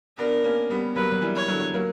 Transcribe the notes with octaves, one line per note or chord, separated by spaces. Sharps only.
B3 D4 A#4
A#3 C#4
G3 B3
F#3 A#3 B4
F#3
E3 G3
C#5
D3 F#3
F#3 A#3